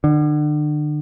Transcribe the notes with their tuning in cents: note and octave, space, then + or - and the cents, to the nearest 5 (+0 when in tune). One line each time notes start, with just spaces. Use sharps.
D3 +35